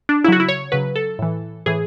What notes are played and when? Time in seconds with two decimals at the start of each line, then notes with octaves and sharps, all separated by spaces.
0.09 D4
0.24 C#3 E4
0.28 F#3 F#4
0.40 E4
0.48 C#5
0.72 C#3 F#3 B4
0.96 A4
1.19 A2 E3
1.66 A2 E3 G#4